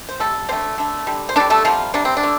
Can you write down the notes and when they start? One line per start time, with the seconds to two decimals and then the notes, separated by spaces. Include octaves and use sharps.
0.09 C5
0.19 C3 G3 A3 A4
0.49 D3 C4 C5
0.53 A3
0.78 D3 A3
1.07 D3 G3
1.29 C5
1.36 D3 G3 D4 D5
1.50 A3 A4
1.65 C3 F3 G3 F4
1.94 C3 G3 D4
2.05 C4
2.17 D4
2.23 D3 A3